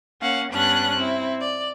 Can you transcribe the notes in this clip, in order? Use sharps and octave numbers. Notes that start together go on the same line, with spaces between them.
A#3 C#4 F5 F#5
G2 B3 C#4 D4 F#6
C4 E4
D5